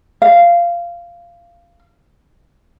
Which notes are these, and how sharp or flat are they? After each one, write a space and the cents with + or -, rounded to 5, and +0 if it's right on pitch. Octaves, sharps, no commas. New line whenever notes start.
F5 -15